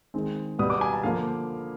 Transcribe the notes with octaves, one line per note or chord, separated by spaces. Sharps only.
D#3 G#3 C4
B2 G3 B3 D#6
D6
G#5
A5
D3 F3 A#3 F5